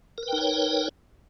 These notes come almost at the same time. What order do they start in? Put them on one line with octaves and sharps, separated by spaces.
A#4 B4 G5 D#4 C#5